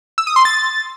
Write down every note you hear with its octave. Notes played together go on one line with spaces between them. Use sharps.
E6
D#6
C6
A6